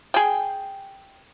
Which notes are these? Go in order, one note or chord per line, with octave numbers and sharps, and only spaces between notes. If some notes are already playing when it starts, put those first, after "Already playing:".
G#4 G5